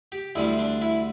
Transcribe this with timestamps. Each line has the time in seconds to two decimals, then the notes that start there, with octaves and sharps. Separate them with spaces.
0.12 G4
0.35 D2 D3 G3 C4 E4
0.59 D4
0.82 E4